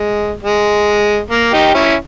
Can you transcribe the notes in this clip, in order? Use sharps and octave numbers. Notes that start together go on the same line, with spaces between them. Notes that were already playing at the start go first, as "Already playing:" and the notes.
Already playing: G#3
G#3
A#3
D#4 G4
C#4 E4